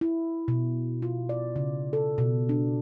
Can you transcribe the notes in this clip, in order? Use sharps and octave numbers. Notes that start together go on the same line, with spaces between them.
E4
B2
F4
D5
C#3
A4
B2
D4